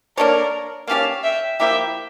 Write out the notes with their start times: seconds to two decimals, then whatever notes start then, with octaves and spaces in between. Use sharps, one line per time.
0.17 A#3 D4 A4 A#4 C#5 D5
0.87 A#3 C#4 G4 C#5 F5 A5
1.23 E5 G5
1.59 F3 A#3 E4 G4 E5 G5